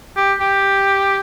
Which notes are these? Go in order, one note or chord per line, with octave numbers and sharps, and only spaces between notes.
G4
G4